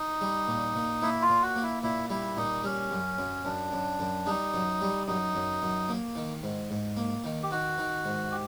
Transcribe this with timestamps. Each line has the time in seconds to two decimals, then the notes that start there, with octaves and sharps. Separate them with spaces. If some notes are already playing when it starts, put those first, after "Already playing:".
Already playing: D#4
0.21 G3
0.48 A#2
0.75 A#2
1.02 A#3 E4
1.22 F4
1.29 A#2
1.42 F#4
1.56 A#3
1.63 E4
1.83 A#2 E4
2.10 G3 E4
2.37 A#2 D#4
2.64 G3 C#4
2.91 F#2
3.19 F#2
3.45 F#2 D4
3.72 F#2
3.99 F#2
4.26 G3 D#4
4.54 F#2
4.81 G3
5.07 F#2 D#4
5.35 F#2
5.62 F#2
5.89 A#3
6.15 D#3
6.43 G#2
6.70 G#2
6.97 A#3
7.24 D#3
7.43 G4
7.51 D#3 F#4
7.78 D#3
8.05 G#2
8.32 G4